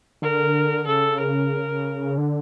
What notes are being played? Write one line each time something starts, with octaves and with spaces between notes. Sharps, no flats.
D3 A#4
C#3 A4
A#4
D3